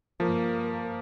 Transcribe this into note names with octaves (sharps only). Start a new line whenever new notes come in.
G2 F3 A#3